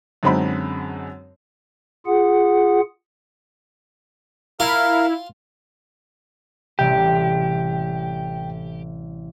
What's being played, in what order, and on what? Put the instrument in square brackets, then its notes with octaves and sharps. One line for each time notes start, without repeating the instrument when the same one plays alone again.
[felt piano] F#2 D3 G#3 C4 D#4 B5
[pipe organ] F4 G#4 F#5
[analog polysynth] E4 [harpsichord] F4 [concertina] A#4 F5
[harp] A1 C3 G3 [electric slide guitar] G4 [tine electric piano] G5